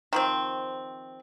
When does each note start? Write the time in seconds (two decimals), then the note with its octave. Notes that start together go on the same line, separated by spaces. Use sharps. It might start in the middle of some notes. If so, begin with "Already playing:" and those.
0.13 D#3 F3 C4